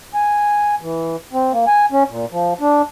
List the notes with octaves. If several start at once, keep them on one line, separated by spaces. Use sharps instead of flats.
G#5
E3
C4
A#3
G#5
C#4
A#2
F3
D4